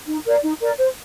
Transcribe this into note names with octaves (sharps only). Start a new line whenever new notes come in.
D#4
A#4 D5
D#4
A#4 D5
C5